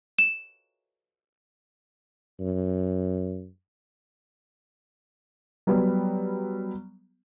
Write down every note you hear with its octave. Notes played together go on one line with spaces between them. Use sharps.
E7
F#2
F#3 G3 B3